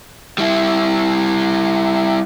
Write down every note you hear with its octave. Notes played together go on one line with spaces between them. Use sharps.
G3 E4